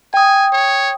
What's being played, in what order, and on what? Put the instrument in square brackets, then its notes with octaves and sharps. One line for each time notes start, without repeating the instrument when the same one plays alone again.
[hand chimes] G5 D#6 [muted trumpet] G#5
[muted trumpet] C#5